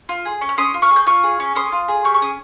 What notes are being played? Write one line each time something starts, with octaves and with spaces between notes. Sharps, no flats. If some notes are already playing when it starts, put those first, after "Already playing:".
F4
G#4
C#4
F6
C#4 C6 D#6
F4
C#6 F6
G#4
G6
F4 C#6 F6
G#4
C#4
C#4 C6 D#6
F4
G#4
G4 C#6 F6
C#6
C#4 D#6